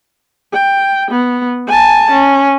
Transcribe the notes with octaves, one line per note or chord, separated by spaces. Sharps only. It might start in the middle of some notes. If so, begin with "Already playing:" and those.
G5
B3
G#5 A5
C#4